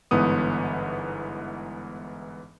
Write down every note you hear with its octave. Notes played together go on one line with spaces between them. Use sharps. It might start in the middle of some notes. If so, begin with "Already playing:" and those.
G1 G#2 E3 B3 D#6